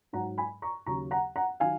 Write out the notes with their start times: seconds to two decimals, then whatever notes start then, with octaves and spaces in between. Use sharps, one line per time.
0.13 G#2 F#3 F#5 A#5
0.38 G#5 B5
0.62 A#5 C#6
0.86 D#2 C#3 F#3 A#5 C#6
1.11 F#5 A#5
1.36 F#5 A#5
1.60 D#3 F#3 F5 G#5